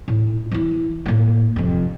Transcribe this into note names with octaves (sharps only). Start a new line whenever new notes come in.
A2
E3 E4
A2 A#3
F1 F2